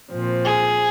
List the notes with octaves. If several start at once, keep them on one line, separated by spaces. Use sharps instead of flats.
A#2 F3 C4
G#4